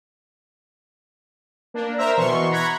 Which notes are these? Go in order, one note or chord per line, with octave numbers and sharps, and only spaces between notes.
A#3 D4
A#4 C5 E5 A#5
B2 E3 B3 C6 C#6
A#5 B5 C#6 F#6 G#6